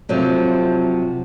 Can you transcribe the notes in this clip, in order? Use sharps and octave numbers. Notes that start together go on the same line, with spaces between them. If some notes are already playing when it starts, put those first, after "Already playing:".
C3 F3 F#3 A3